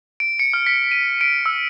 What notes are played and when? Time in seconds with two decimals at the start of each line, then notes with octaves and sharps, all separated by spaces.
0.20 D7
0.39 C#7
0.53 F6
0.66 B6
0.91 D#7
1.21 D7
1.46 E6